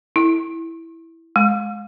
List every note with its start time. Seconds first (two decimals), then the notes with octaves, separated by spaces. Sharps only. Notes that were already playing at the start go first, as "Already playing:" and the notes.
0.16 E4
1.36 G#3